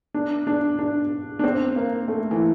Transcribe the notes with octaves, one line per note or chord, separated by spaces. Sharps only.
D4
D4
D4
D4
C4
A#3
A3
E3